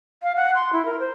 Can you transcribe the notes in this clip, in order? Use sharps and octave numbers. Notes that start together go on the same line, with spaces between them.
F5
F#5
C6
E4
A#4
C5